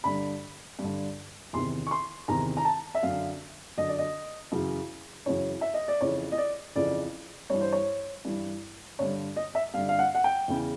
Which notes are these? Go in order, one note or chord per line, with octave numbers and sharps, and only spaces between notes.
G2 D3 B5
G2
D3
E2 C3 D#3 C6
C#6
C6
E2 C3 D#3 A#5
A#5
A5
E5
F#2 D3 F5
F#2 D3 D#5
D5
D#5
F#2 C#3 E3
F#2 C#3 E3 C#5
E5
D#5
D5
F2 C#3 E3 C#5
D#5
D5
F2 C#3 E3 D5
G2 E3 C#5
C5
C#5
G2 E3
G2 D3 C#5
D#5
E5
G2 D3 F5
F5
F#5
F#5
G5
E2 C#3 E3